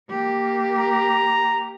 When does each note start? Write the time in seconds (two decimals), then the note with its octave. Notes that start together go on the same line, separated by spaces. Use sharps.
0.10 A#3 G4
0.78 A#5